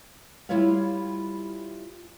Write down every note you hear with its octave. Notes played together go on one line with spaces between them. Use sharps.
G3 E4 F4 C#5 E5 F5